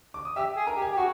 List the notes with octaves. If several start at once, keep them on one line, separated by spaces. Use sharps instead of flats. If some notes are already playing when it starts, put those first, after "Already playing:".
D6
D#6
G4 E5 E6
G#4
A#4 A#5
G4
G#4 G#5
G4
F#4 G#4 G#5